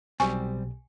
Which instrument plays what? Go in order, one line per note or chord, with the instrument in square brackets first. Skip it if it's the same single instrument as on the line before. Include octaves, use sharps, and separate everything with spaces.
[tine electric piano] B1 B2 [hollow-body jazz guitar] G3 C4 [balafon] G#5 C#6